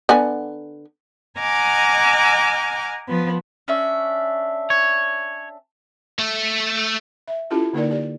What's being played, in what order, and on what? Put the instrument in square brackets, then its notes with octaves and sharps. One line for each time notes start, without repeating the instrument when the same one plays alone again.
[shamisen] D3 B3 G#5
[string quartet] D#5 F#5 G#5 A#5 D6 F6
F3 B3
[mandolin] C#4 D4 E5
[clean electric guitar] C#5
[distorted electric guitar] A3
[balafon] E5
C#4 E4 F4 G4 A4 A5
D3 A#3 D#4 A#4 D5
G4 D5